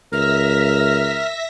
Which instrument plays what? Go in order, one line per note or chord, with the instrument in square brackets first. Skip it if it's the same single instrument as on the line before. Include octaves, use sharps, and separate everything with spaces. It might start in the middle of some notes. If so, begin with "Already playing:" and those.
[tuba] C#2 [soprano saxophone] A#4 [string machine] E5 A#6 B6 [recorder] F6